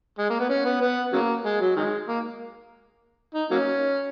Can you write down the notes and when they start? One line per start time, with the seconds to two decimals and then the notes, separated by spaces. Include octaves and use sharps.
0.19 G#3
0.30 A#3
0.40 B3
0.49 C#4
0.65 B3
0.81 B3
1.13 C#3 F#3 A#3
1.45 G#3
1.61 F#3
1.76 D#3 G#3
2.08 A#3
3.34 D#4
3.51 F#3 A#3 C#4